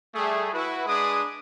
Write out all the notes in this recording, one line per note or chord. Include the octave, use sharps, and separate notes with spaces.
G3 A3 G#4
E4 F#4 B4
G#3 D4 G#4 B4 D6 D#6